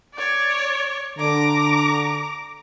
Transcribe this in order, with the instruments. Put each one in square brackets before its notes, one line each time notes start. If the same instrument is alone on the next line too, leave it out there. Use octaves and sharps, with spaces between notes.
[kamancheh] C#5 D5
[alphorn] D3 [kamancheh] A#5 D6